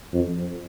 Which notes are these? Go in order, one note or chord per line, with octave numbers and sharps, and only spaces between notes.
F2